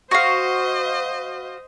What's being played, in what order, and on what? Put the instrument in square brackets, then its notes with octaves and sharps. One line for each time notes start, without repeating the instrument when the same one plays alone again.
[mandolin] F#4 F5 [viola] C5 D#5